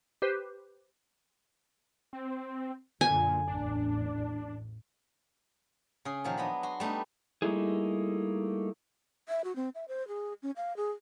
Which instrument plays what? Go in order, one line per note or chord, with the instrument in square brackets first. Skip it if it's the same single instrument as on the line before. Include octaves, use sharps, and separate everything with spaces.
[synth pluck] G4 B4 C5
[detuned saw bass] C4
[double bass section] F#2 D3 [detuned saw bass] A#2 [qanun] G#5
[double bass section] A1 E2 [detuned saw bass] D4
[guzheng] C#3 G#4
A#2 D#3 F3 F#3
B3 D4 D#5 B5
F#4 C6
G3 A3 B3 D4 D#4
[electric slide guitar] G3 A3 A#3 D#4 E4 G#4
[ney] E5
F#4
C4
E5
C5
G#4
C#4
F5
G#4